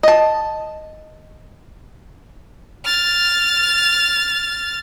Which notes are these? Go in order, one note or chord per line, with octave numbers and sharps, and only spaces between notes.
D#5 A5
F6 A6